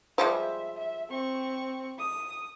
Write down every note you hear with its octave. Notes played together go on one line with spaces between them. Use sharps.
F3 G3 G#3 E5
E5
C4 C#6
D#6